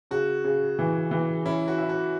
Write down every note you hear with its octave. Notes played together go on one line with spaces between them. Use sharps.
C#3 F#4
C#3
E3
E3
C#4 E4
F#4
E4
F#4